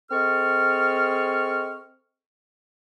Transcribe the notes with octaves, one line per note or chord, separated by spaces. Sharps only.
C4 G#4 A4 D#5 C#6 F6